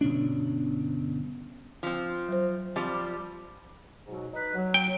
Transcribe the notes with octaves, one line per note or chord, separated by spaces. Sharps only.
G1 B2 C#4 D4
F3 C4
F#3 C5
F3 G3 C4
G#2 B2 F#3
D#4 B4
F#3
G5